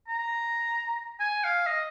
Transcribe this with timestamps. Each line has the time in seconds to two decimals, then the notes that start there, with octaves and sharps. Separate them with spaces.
0.08 A#5
1.20 G#5
1.44 F5
1.67 D#5